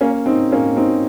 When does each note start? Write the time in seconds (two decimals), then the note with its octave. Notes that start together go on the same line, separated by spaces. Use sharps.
0.01 A#3 C#4
0.26 C4 D#4
0.52 A#3 C#4
0.76 C4 D#4